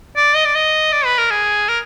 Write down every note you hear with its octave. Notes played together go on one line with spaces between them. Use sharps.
D5
D#5
D5
D#5
D5
B4
A#4
G#4
A#4